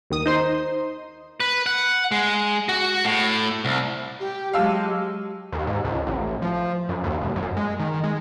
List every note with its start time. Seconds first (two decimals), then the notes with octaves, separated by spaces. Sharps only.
0.10 D#2 D#3 D#6
0.26 D#4 C5 C6
1.40 B4
1.66 F#5
2.12 G#3
2.69 F#4
3.04 A2
3.65 C2
4.20 G4
4.53 F#3 G#3 G4 F5 A5 E6
5.52 D#2
5.67 G#2
5.85 C#2
6.07 A1
6.42 F3
6.89 F#2
7.04 D#2
7.21 E1
7.36 F#2
7.57 G#3
7.80 D#3
8.04 G#3